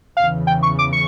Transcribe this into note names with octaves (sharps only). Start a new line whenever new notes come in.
E2 C#3 E3 F5
G5
C#6
D6
C#6